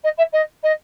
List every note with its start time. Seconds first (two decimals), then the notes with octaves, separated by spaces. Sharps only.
0.04 D#5
0.18 E5
0.33 D#5
0.63 D#5